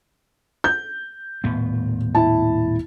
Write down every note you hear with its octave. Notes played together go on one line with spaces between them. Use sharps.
G6
D#1 A2 B3
E4 A5